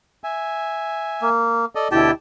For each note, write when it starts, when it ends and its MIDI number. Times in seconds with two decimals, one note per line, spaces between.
0.24 1.29 76
0.24 1.29 80
1.22 1.65 58
1.75 1.88 69
1.75 1.88 74
1.75 1.88 75
1.92 2.11 38
1.92 2.11 47
1.92 2.12 64
1.92 2.11 67
1.92 2.11 79
1.92 2.11 81